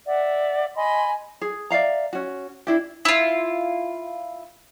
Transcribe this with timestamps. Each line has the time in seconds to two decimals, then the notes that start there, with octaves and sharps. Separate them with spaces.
0.05 D5 E5 F#5
0.75 D#5 G#5 B5 C6
1.41 G#4
1.70 D5 E5 F5 A#5
2.13 C#4 F#4
2.67 D4 E4 G4
3.05 E4 F4